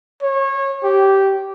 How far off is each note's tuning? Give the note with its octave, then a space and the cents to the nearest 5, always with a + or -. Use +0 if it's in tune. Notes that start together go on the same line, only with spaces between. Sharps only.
C#5 -25
G4 -10